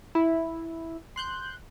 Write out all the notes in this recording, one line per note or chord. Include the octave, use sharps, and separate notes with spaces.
E4
C6 F#6 G6